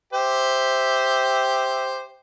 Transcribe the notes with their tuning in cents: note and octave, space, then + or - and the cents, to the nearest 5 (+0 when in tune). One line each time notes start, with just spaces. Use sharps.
G4 +0 C5 +0 E5 -10